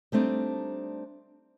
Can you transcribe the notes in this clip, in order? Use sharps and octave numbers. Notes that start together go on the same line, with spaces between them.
G3 A3 C4 D4 D#4